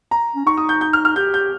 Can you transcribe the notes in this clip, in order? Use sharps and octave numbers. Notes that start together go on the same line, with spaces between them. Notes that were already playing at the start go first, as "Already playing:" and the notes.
A#5
C#4
D#4 C#6
D#6
G6
G6
F6
F6
G4 G6
G6